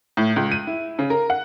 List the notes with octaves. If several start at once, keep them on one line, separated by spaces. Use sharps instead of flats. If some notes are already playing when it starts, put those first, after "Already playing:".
A2
C#2
D#7
E4
C#3
A#4
F#5